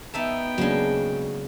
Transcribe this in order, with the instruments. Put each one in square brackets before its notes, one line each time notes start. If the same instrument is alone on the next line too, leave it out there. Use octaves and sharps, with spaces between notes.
[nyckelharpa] B3 G5 [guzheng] D#4 E5 A5
[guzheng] C#3 G#3 [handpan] F#3 A#3 D4